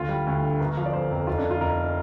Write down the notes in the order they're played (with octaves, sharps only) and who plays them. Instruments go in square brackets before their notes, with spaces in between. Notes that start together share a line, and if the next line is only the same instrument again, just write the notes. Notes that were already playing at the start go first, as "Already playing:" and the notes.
Already playing: [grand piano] D2 F4
G3
D2
D3
G1 A#4
F3 F5
D5
G1 C5
F2 A#4
F1 F4
D4
D3
F4
F1 A#4